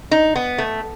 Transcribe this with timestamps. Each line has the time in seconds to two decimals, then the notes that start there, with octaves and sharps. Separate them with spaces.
0.11 D#4
0.36 B3
0.58 A3